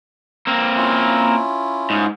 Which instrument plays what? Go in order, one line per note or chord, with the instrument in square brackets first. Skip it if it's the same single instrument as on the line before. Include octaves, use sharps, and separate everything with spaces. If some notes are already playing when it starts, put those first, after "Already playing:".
[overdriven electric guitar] A#3 C4
[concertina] C#4 E4 F4
[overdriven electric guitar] G#2